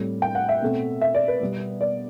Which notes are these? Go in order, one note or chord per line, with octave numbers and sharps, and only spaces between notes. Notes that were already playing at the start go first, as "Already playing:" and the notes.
Already playing: A2 G3 C4
G5
F#5
E5
B2 A3 C4
E5
D5
B4
B2 G3 B3
D5